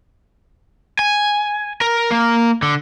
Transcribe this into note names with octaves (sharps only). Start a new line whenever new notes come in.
G#5
A#4
A#3
D3